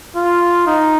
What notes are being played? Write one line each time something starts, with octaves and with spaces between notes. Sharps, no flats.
F4
D#4